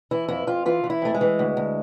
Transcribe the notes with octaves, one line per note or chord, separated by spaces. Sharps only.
E3 E4
F2 E4
F2 F4
E3 F4
E3
E4
F2 A3
G#3
E3
D2
D2